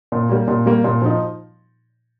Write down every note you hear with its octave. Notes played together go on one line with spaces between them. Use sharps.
A#2
G3 A#3
A#2
G3 A#3
A#2
F3 D#4